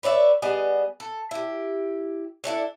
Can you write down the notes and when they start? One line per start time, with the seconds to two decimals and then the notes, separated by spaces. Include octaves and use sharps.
0.03 B4 C#5 D5 E5
0.42 G3 B3 G#4 D#5
1.00 A4
1.31 E4 G4
2.44 D4 E4 A4 C#5